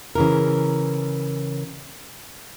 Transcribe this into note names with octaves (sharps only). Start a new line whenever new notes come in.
C#3 E3 A#4